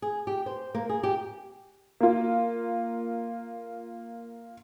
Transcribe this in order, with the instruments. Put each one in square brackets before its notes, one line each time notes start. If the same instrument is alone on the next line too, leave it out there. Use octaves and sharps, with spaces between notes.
[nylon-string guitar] G#4
G4
C5
A#3
G#4
G4
[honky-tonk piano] A#3 F4